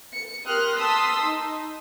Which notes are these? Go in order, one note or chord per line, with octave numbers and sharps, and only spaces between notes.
C#7
G4 A#4 C6 D#6 F6 F#6
A5 C6 D#6 E6 B6
D#4